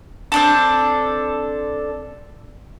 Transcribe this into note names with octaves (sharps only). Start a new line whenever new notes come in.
C4 D4 A4